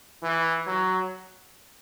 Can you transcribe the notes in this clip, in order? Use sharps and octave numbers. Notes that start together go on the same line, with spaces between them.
E3
F#3